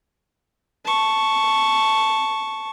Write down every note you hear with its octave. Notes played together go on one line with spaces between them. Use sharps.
A5 C#6